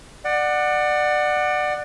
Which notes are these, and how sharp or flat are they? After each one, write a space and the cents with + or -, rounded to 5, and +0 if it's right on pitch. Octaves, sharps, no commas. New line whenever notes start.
D5 +25 F#5 +0